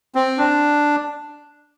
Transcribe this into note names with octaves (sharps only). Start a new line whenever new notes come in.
C4
D4